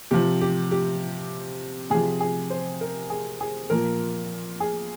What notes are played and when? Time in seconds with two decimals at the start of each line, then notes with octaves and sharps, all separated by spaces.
0.11 C3 F3 G4
0.41 G4
0.71 G4
1.90 C3 F3 G#4
2.21 G#4
2.50 C5
2.81 A#4
3.10 G#4
3.41 G#4
3.70 A#2 F3 A#4
4.60 G#4